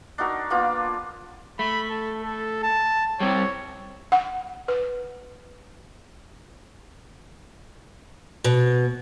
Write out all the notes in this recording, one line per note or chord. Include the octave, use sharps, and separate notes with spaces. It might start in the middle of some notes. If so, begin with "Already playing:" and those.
D4 D#4 F#4 A#4
A#3 B3 D4 F4
A3 B5
A4
A4
A5
G3 C4 C#5
F#5
B4
B2